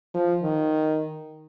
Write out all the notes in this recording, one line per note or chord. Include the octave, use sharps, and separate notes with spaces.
F3
D#3